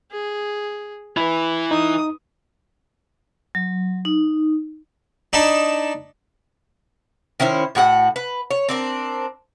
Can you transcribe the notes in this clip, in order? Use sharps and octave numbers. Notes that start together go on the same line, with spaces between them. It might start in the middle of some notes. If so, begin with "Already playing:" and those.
G#4
E3 E4 B4 B5
D#4 D#6
F#3
D#4
D4 D#4 A5 B5
D#3 C#4 E4 C5
A2 F#4 G4 F#5
B4
C#5
C4 D4 A#4